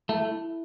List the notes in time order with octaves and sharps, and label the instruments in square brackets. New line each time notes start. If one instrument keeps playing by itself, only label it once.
[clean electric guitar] A3 [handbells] E4
[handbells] E4